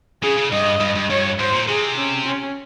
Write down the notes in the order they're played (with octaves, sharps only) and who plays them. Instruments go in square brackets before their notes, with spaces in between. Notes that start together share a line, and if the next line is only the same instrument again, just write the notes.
[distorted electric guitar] C#3 [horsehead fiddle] G#4
[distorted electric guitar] C#3
[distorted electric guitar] G2 [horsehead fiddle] D#5
[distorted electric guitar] G2
G2
[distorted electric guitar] G2 [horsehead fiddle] C#5
[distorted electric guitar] G#2 [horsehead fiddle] C5
[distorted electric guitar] A#2
[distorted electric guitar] C3 [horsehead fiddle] G#4
[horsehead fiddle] C#4
C#4